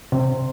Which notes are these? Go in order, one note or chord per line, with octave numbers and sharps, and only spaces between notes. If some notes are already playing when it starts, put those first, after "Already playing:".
C3